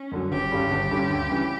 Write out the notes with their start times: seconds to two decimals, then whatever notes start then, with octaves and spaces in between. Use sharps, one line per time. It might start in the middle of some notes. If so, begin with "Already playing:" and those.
Already playing: C#4
0.12 F#2 D3 F#3
0.31 G1 G4
0.51 G2 D3 G3 C#4
0.71 G1
0.91 G2 D3 G3 C#4
1.10 D2
1.29 C#3 E3 G3